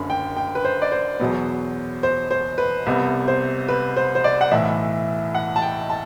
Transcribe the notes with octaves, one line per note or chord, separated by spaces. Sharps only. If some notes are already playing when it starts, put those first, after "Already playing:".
Already playing: F#1 F#2 D3 B5
G5
G5
B4
C5
D5
C5
E2 B2 F#3 B3
C5
C5
B4
C2 C3 G3 B3
C5
B4
C5
C5
D5
F#5
B1 A2 E3 E5
F#5
A5
G5
A5